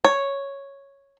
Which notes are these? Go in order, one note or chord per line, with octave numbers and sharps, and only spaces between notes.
C#5